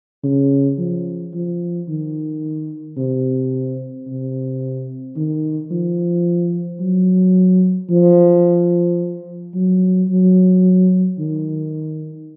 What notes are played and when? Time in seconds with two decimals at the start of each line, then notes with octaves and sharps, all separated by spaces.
0.24 C#3
0.78 F3
1.34 F3
1.89 D#3
2.97 C3
4.07 C3
5.17 D#3
5.71 F3
6.80 F#3
7.90 F3
9.54 F#3
10.09 F#3
11.19 D#3